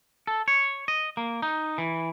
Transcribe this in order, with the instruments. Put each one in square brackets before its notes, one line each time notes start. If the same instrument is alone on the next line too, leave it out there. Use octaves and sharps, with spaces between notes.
[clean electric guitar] A4
C#5
D#5
A#3
D#4
E3